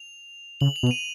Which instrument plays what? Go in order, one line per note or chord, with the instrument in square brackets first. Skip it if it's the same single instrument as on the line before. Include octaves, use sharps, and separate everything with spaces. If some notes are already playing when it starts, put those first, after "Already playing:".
Already playing: [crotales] F7
[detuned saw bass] C#3 [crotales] F#7
[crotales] F7
[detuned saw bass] B2
[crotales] F7
D#7